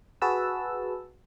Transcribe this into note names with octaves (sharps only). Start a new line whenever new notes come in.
F#4 G#4 B4 A5 E6